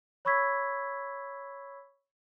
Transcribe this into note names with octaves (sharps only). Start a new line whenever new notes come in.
C#5 B5 C#6 E6 G#6 B6